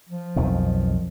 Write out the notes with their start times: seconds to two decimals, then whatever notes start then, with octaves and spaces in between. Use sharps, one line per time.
0.09 F3
0.36 B1 F2 D#3